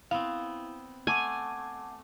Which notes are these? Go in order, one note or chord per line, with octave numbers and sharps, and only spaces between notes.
B3 C4 E4 F5
A3 F#5 G#5 A5 D6